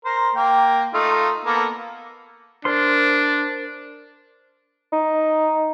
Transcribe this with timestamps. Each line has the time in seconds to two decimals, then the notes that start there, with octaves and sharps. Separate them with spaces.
0.05 A#4 C5
0.35 A#3 G5
0.94 A3 D#4 F4
1.45 A#3 B3 A4
2.65 D4 A#4 C5 C6
4.93 D#4